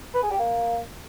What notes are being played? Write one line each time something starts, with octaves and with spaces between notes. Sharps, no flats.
B4
G#4
G4
A#3